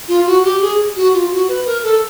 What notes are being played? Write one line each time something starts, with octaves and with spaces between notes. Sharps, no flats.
F4
F#4
G4
G#4
F#4
F4
F#4
B4
A#4
A4